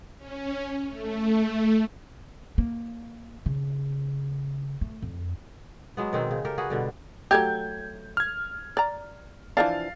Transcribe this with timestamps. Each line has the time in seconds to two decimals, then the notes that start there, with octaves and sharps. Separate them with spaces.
0.18 C#4
0.88 A3
2.58 A#3
3.46 C#3
4.81 A3
5.02 F2
5.97 F#3 G#3 B3
6.13 B2 D#3 C4
6.31 C#3
6.45 G4 A4 A#4
6.58 F#4 G#4 B4
6.70 B2 D3 G3
7.31 F#3 A3 G4 G6 G#6
8.17 F6 G#6
8.77 D5 A#5
9.57 E3 F3 D4 F5 A6